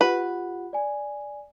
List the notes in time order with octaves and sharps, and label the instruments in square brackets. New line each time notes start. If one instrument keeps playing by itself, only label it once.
[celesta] F4 G4 F#5 [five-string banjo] B4
[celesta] D5 G#5